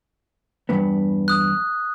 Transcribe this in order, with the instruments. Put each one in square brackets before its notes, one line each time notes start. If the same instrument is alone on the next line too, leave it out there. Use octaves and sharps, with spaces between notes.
[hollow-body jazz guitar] E2 G2 B3
[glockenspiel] D#6 F#6